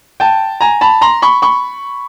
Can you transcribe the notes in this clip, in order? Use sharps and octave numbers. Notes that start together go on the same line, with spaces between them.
G5 A5
G#5 A#5
A5 B5
A#5 C6
B5 C#6
B5 C#6